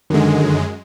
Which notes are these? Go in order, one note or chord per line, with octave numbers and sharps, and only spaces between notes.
F#2 D3 D#3 G#3